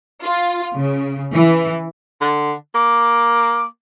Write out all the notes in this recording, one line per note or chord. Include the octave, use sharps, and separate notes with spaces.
F4
C#3
E3
D3
A#3 D6